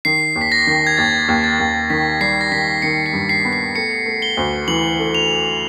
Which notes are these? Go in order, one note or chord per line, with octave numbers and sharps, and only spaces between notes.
D#3 C7
D#2
B6
A#6
D#3
G#6
D#2 A6
D#2
A6
D#2
D#3 B6
G3 C7
A#6
D#3 B6
D#3 C#7
C7
G2
C7
B3
C7
A3 C#7
A3
G7
D2
E3 F#7
A3
F7